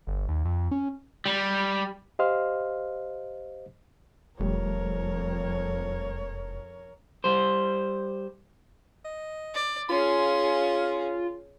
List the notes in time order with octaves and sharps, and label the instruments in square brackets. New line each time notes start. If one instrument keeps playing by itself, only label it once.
[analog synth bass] G1
D#2
F2
C#4
[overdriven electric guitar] G3
[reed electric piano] G4 C5 D#5 F5 C6 F6
[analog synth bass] E1 [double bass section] F2 [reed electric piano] F3 G3 A3 [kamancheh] A#4 C#5
[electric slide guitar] G3 C5
[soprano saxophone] D#5
[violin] D5
[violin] C#4 G#4 [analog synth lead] F4 [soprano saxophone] C6